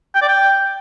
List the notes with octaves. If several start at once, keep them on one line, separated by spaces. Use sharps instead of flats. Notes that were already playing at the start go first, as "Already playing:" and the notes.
G5
D5
G5